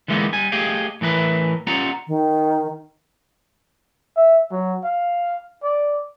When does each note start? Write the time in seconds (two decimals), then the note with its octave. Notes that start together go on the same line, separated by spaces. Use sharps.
0.08 D3 E3 G#3 A#3 B3 D#4
0.33 G3 G#5
0.52 A3 G4 G#4 D#5 F5 G5
1.01 A2 E3 A#4 B4
1.67 C#4 F4 G4 D5 F#5 A#5
2.07 D#3
4.16 E5
4.52 F#3
4.84 F5
5.63 D5